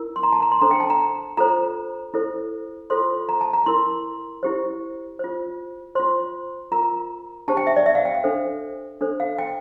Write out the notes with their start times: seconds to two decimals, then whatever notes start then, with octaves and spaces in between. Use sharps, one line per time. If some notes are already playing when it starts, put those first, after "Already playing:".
Already playing: E4 A#4
0.16 C6
0.23 A#5
0.32 A5
0.42 A#5
0.52 C6
0.61 D4 A4 C5 A#5
0.71 G5
0.80 A5
0.90 A#5
1.37 F4 A4 C5 A#5
2.14 E4 A4 C5
2.90 F4 A4 C5 C6
3.29 A#5
3.41 A5
3.53 A#5
3.66 E4 A#4 C6
4.43 E4 G4 C5
5.19 F4 C5
5.95 F4 C5 C6
6.72 F4 A#4 A#5
7.48 D4 G4 C5 A5
7.57 G5
7.67 E5
7.76 D5
7.86 E5
7.95 F5
8.05 G5
8.15 F5
8.24 D4 A4 C5
9.01 D4 A4 C5
9.20 F5
9.39 G5